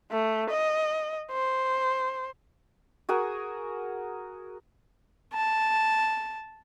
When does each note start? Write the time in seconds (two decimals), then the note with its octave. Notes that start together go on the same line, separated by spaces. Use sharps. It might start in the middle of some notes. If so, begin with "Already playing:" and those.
0.11 A3
0.50 D#5
1.31 C5
3.09 F#4 G#4 A#4 G#5
5.33 A5